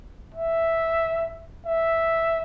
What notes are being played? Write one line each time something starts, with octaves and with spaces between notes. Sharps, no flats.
E5
E5